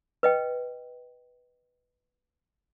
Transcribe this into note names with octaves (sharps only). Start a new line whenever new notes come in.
B4 D#5 G5